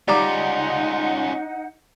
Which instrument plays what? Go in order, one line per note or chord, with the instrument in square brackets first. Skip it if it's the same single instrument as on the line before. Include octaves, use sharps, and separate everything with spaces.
[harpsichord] G3 [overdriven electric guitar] C#4 F4 [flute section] D#4 F#5 [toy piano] D5 A#5 D6